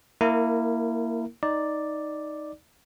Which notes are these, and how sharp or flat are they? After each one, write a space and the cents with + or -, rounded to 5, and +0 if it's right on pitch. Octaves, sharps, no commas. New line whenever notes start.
A#3 +0 E4 +0 A#4 -25
D#4 +0 D5 +0